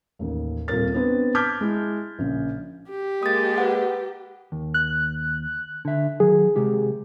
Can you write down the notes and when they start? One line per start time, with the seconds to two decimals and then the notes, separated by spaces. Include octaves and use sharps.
0.19 A1 D#2
0.68 D#1 C3 F4 A#4 A6
0.94 B3 C4 D4 B4 C5
1.35 A5 D6 F6 G6 G#6 B6
1.61 G#3 E4
2.19 A#1 C#3
2.90 G4
3.23 G#3 A#3 D#6 A6
3.58 B4 F#5
4.52 D#2
4.74 F#6
5.85 D3 E5
6.20 D#3 F#3 G#4
6.56 C3 G#3 G4